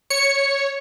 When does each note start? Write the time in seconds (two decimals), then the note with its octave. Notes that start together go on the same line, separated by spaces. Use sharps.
0.10 C#5 C#7